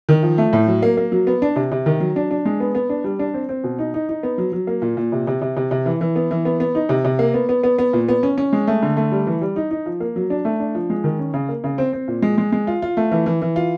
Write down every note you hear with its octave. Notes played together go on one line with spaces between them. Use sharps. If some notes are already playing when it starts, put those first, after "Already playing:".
D#3
F3
A3
A2
F#3
A#3
A#3
F#3
B3
D4
C3
C3
D#3
F#3
D4
D4
G#3
B3
B3
D4
G3
D4
C4
C4
B2
D#4
D#4
D#4
B3
F#3
F#3
A#3
A#2
A#2
C3
C3
C3
C3
C3
E3
E3
B3
E3
B3
B3
D#4
C3
C3
A#3
B3
B3
B3
B3
A#2
B3
C#4
C#4
G#3
A3
D3
A3
G3
E3
G3
D#4
D#4
F3
A#3
F#3
D4
A3
D4
F3
G#3
D#3
C#4
C#3
A#3
C#3
C4
C4
A#2
G#3
G#3
G#3
F4
F4
A3
E3
E3
E3
F4